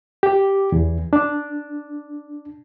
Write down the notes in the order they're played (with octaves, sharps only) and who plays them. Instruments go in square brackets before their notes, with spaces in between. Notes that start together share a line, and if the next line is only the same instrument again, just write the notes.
[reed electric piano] G4
E2
D4